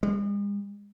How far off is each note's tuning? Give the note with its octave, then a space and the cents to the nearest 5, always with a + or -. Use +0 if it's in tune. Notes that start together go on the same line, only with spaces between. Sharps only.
G#3 -45